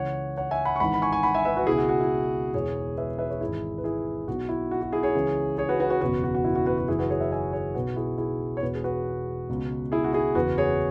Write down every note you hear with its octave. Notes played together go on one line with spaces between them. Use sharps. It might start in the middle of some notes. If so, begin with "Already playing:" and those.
Already playing: C#2 C#3 E3 C#5 F#5
C#5 F#5
E5 G#5
F#5 B5
C#6
G#1 G#2 E3 F#5 B5
B5
G#5 C#6
G#5 C#6
F#5 B5
E5 G#5
B4 E5
F#4 B4
C#2 B2 E4 G#4
F#4
F#4
E4
E1 E2 E3 G#4 C#5
B4 E5
B4 E5
G#4 C#5
G#1 G#2 E3 E4 G#4
B4
E4 G#4
B1 B2 F#4
E4
F#4
F#4
E4 G#4
G#4 C#5
C#2 C#3 E3
G#4 C#5
F#4 B4
F#4 B4
F#4 B4
F#1 E2 B2 F#4 B4
F#4
F#4
E4
F#4
F#4 B4
F#4
F#1 F#2 E3 E4 G#4
F#4 B4
G#4 C#5
B4 E5
E5 G#5
G#4 C#5
B1 B2 F#4 B4
E4 G#4
E4 G#4
C#5
E1 E2 B2 F#4 B4
G#4
F#4 B4
C#2 B2
E4 G#4
F#4
E4 G#4
F#1 E2 E3 F#4 B4
G#4 C#5